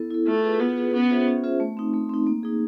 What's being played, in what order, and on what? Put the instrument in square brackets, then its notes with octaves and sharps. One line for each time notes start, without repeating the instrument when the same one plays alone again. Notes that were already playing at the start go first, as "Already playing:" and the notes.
Already playing: [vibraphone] B3 E4 A4
E4 A4
[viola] A3 [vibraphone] F4
[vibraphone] G#4 B4
[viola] B3 [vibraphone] F4
[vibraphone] G#4 B4
[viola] B3 [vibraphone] C#4
[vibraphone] F4 G#4 C5 E5
C#4
F4 G#4 C5 E5
A3
C4 D#4
A3
C4 D#4
A#3
D#4 G#4